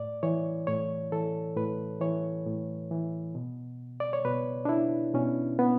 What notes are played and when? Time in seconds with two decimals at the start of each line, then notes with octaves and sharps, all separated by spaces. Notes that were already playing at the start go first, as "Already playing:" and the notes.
Already playing: A2 D5
0.23 E3 C#5
0.67 A2 C#5
1.12 E3 A4
1.56 A2 B4
2.01 E3 C#5
2.46 A2
2.91 E3
3.35 B2
4.00 D5
4.13 C#5
4.25 B2 B4
4.65 D4
4.69 E4
5.14 B2 C#4
5.59 B3